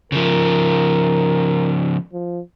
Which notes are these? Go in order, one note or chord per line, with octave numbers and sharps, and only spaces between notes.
C#3 F3 A#4
F3